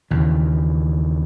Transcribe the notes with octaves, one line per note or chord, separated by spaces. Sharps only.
D#2 C#3 E3